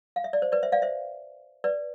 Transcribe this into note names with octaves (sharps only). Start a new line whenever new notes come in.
F5
E5
D5
C5
B4 D5
C5 E5
D5 F5
C5 E5
B4 D5